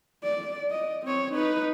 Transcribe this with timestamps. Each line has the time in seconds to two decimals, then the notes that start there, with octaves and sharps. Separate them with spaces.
0.24 D5
0.71 D#5
1.04 C4 C#5
1.33 D#4 B4